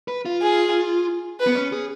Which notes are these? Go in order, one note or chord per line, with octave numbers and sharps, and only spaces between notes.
B4
F4
G#4
B4
B3
C#4
G#4